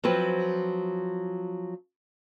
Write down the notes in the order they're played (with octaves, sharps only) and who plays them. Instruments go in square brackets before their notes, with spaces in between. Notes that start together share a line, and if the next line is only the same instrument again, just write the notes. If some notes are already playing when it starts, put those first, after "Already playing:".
[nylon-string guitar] F3 F#3 C4 B4